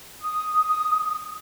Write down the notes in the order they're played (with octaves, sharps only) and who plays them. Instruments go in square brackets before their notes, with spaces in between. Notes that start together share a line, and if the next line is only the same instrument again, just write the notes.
[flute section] D#6